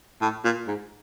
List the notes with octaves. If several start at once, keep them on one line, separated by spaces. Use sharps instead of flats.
A2
A#2
G#2